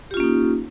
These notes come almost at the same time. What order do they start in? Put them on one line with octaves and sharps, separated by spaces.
G4 F4 C#4 A#3 D#4